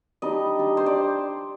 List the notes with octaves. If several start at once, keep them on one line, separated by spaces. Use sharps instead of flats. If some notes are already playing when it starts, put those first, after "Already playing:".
G3 D4 D#4 D#5
G3 D4
C5
D5